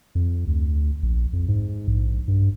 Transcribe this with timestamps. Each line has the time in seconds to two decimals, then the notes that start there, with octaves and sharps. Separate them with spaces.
0.15 F2
0.47 D2
1.03 A#1
1.33 F2
1.48 G#2
1.87 A#1
2.28 G2